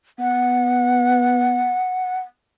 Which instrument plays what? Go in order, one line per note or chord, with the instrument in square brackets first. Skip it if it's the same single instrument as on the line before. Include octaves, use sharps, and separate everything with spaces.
[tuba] B3 [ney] F#5